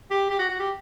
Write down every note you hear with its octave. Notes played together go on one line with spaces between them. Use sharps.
G4
G4
F#4
F#4
G4